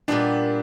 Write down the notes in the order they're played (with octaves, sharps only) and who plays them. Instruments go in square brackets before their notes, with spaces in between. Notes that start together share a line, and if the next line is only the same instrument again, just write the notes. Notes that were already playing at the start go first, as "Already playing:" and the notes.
[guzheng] A#2 G3 B3 [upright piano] D4